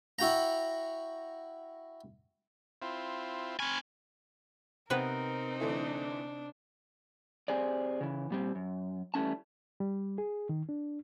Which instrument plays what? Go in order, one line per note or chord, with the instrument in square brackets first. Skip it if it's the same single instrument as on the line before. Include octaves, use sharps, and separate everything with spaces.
[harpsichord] E4 F#4 G5 A#5
[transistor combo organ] C4 E4 F4
[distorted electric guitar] C4 G#5 [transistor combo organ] B5 C#6 F6
[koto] C3 B3 B4 [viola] C4 D#4 [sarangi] A#4
[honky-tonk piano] D3 E3 A3 [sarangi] D4
[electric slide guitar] C4 G4 G#4 C5 D5
C#3 E3
A#2 G3 C4
F#2
E3 G3 A3 C#4 A5
[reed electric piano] G3
G#4
D#3
D4